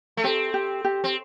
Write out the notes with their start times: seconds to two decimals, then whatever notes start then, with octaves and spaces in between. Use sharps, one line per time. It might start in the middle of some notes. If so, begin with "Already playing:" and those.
0.17 A3
0.24 C4 G4
0.54 G4
0.85 G4
1.04 C4